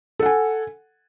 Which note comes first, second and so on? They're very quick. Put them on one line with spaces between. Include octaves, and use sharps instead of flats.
A4 F#5 G#5